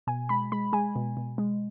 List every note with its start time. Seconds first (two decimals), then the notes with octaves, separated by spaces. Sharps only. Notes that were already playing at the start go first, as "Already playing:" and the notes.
0.07 B2 G#5
0.29 G#3 B5
0.52 G#3 B5
0.73 G#3 G#5
0.96 B2
1.17 B2
1.38 G#3